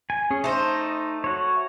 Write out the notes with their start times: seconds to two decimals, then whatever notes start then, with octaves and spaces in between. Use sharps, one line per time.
0.10 G#5
0.30 C#4 G#4
0.44 A3 D#4 C5 D#5
1.24 F#4 C#5